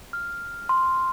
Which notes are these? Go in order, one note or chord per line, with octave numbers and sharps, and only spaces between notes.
F6
C6